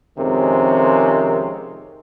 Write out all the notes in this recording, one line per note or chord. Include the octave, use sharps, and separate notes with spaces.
F2 C3 D#3 G#3 C#4 A#4